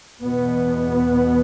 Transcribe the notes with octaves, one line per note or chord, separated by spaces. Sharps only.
E2 B2 B3